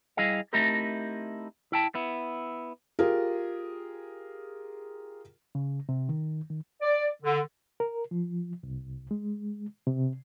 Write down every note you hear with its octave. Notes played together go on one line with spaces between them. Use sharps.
G3 E4 G#4 D#5 F5
A3 C4 D#4 E4 G4 A#4
E4 G5 A5
B3 E4
F4 G4 G#4 A#4
C#3
C3
D#3
D#3
D5
D3
A#4
F3
C2
G#3
C3